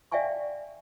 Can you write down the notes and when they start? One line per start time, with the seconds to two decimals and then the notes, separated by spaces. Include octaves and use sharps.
0.12 D5 E5 F5 G5 G#5 C#6